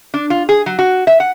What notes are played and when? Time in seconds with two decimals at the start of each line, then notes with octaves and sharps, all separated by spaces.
0.14 D4
0.30 F4
0.49 G#4
0.66 F#3
0.79 F#4
1.07 E5
1.20 F#5